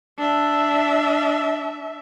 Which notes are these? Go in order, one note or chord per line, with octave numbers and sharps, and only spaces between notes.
D4 E5